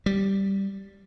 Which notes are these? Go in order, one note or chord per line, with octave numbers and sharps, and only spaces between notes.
G3